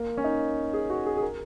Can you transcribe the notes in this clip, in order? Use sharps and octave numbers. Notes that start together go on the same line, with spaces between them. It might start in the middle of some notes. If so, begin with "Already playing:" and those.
Already playing: A#3
C#4
D#4
G#4
F#4
G#4
G#4
A#4